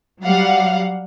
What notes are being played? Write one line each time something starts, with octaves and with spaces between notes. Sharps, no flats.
F#3 G3 F5 F#5